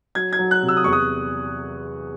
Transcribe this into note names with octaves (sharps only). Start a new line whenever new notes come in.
F#3 G#6
G#6
F#3
F#6
C3
E6
D#6
E2 C#6
D#6